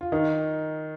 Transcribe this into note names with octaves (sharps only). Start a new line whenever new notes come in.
F4
D#3 D#4